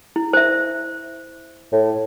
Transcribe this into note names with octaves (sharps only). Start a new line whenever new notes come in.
E4
C5 E5
A2